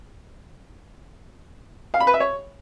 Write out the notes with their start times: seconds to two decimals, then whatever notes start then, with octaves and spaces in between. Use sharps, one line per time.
1.94 F5
2.00 B5
2.07 B4
2.14 E5
2.20 C#5